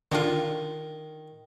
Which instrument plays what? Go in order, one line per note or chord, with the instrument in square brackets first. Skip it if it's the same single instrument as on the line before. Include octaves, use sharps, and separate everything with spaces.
[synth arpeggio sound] D3 D4 F4 [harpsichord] D#3